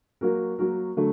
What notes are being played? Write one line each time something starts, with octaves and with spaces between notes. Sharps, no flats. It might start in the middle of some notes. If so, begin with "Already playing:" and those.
F#3 A#3 F#4 A#4
F#3 A#3 F#4 A#4
D3 F#3 A3